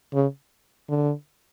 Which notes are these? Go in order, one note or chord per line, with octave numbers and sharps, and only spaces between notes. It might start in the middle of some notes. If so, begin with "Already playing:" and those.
C#3
D3